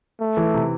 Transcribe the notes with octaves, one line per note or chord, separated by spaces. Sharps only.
A3
E3
C3